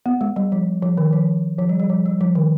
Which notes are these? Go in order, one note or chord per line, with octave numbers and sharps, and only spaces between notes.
B3
G#3
G3
F3
F3
D#3
F3
F3
G3
G3
F3
G3
F3
D#3